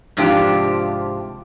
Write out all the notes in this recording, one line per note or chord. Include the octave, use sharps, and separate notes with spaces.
G#2 C3 F3 D4 F4 G4